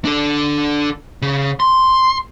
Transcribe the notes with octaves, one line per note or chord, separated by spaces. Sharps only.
D4 A4
C#3
C6